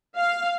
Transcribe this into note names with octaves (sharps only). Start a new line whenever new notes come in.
F5